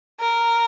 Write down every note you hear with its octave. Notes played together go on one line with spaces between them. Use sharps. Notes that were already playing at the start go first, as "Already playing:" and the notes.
A#4